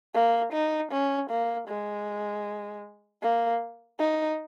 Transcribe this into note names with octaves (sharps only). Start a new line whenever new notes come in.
A#3
D#4
C#4
A#3
G#3
A#3
D#4